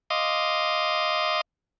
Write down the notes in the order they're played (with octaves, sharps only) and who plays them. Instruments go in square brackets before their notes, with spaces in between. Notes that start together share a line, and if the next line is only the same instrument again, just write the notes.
[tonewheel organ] D#5 F5 C6 D6 D#6